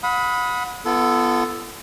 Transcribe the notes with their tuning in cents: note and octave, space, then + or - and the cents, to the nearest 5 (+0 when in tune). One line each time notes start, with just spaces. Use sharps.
F#5 -35 B5 +0 D#6 +25
B3 +0 F4 -45 A4 +0